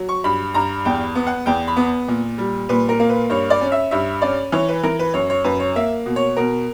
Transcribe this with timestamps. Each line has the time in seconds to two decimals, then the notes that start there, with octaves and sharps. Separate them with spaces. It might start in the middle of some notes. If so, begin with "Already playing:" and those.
Already playing: F#3
0.09 C#6
0.24 G2 B5
0.54 G2 A#5
0.85 E2 G5
1.15 B3
1.27 F#5
1.46 E2 G5
1.67 B5
1.77 B3
2.08 A#2
2.38 G3
2.69 A#2 B4
2.89 A#4
3.00 A#3
3.09 B4
3.30 G2 C#5
3.50 D5
3.61 C#4
3.72 E5
3.91 G2 E5
4.22 C#4 D5
4.52 E3 C#5
4.69 B4
4.83 E3 A#4
4.99 B4
5.14 F#2 C#5
5.30 C#5
5.44 F#2 B4
5.60 C#5
5.76 A#3 E5
6.06 B2
6.16 C#5
6.37 B2 A#4